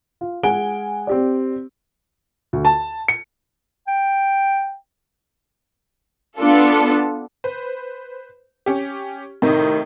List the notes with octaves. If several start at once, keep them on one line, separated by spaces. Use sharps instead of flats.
F4
G#3 F#5 G#5 D7 G7
C4 G4 D5
D2
A5
C#7
G5
B3 D4 F4 A4
B4 C5
C#4 G4
A2 C3 D#3 D#4